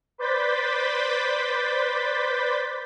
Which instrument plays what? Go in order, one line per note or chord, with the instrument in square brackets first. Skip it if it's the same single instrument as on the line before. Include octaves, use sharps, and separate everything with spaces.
[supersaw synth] B4 C5 D5 G6 A6 B6